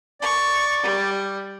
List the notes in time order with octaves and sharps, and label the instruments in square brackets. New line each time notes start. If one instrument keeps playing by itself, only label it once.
[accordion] D5 [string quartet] C#6
[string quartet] G3